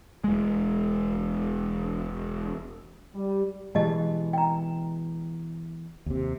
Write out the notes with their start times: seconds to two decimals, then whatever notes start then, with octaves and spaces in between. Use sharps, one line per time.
0.24 E1 G#3
3.14 G3
3.75 B2 E3 G#3 G4 D#5 A5
4.33 G5 A#5
6.06 D#2 C3